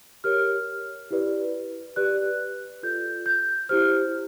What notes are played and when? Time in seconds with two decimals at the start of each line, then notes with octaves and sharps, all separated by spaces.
0.24 G4 A#4 C#5 F6
1.11 E4 G4 B4 D5
1.96 G4 B4 D5 F#6
2.83 F4 A4 D5 G6
3.26 G6
3.69 E4 G4 C5 F6